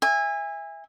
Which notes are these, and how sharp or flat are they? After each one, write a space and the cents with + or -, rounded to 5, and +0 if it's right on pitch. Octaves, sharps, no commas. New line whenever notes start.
E5 +0 G#5 -25